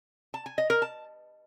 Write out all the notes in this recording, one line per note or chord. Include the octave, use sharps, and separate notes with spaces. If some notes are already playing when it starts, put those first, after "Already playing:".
A5
G#5
D#5
A#4
A5